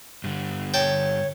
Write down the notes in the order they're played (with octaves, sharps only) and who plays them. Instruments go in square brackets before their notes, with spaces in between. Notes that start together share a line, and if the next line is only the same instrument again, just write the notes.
[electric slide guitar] G2 D3
[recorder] C#5 [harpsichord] G5 A5